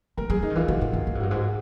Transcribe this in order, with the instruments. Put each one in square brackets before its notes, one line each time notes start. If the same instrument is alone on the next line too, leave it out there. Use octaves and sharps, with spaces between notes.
[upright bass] A3 [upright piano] A#4
[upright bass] G3 [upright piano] G#4
[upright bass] F3 [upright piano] D#4
[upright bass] D#3
[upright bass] E3 [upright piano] F4
[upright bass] D3 [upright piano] F#4
[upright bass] A2
G#2
A2
G#2
[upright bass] G2 [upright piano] F#4
[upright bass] G#2
[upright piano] F#4